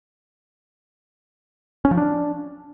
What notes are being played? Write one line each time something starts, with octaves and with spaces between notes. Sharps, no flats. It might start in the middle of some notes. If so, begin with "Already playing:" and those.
C#4
F3
D4